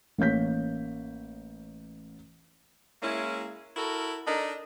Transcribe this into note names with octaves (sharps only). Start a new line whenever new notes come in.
A1 A#3 C#5 G6 B6
G#3 A#3 C#4 E4
E4 F#4 A4 A#4
D4 D#4 A4 A#4 D#5